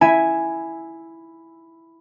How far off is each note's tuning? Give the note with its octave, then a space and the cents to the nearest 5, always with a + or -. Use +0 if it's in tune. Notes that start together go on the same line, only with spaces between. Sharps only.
E4 +0 E5 +0 G#5 +0